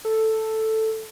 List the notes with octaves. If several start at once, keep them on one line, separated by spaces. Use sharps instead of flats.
A4